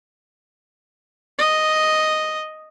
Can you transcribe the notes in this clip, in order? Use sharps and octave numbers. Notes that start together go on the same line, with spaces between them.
D#5